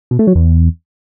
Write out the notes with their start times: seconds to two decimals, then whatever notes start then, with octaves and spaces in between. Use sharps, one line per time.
0.11 B2
0.19 A3
0.27 F#3
0.35 E2